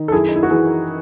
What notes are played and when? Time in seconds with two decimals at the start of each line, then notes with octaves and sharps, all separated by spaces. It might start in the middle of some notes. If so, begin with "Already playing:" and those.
Already playing: D#3
0.08 A4
0.12 F#2 E4 G#4
0.29 D#4
0.36 E4
0.43 F#4
0.50 E3 E4 G#4